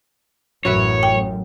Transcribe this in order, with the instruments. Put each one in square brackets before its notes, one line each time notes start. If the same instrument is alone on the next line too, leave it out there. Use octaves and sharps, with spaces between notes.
[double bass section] A1 F#2 [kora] F#3 B4 E5 [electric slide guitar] C#5
[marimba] G5